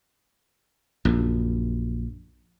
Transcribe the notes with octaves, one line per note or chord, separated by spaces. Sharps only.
A#1 F#2